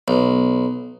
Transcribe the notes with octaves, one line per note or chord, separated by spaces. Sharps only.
B1